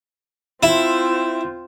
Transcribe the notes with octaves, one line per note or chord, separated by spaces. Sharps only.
C4 E4 F4